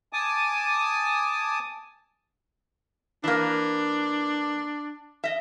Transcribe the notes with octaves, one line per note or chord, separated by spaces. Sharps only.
G#5 A5 D6 D#6
E3 A#3 D4
D#5 E5